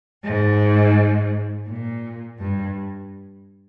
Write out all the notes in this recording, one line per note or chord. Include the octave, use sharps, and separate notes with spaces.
G#2
A#2
G2